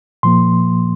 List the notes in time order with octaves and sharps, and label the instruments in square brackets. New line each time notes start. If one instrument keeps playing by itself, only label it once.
[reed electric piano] A#2 F3 A#3 C6